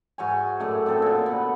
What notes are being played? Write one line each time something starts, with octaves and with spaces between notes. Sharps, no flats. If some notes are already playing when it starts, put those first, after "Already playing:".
G#2 F#4 C#5 G#5
F#2 A2 A3 D5
A2 C4 A4 D#5
A#2 D3
B3 B4 F#5